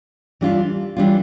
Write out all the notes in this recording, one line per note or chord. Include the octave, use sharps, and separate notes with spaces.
E3 G3 D4 F4
E3 G3 D4 F4